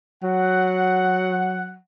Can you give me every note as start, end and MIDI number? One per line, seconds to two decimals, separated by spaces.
0.23 1.76 54
0.23 1.72 78